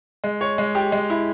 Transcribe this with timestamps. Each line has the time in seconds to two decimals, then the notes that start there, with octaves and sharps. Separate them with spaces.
0.24 G#3
0.41 C#5
0.58 G#3
0.75 G4
0.92 G#3
1.10 E4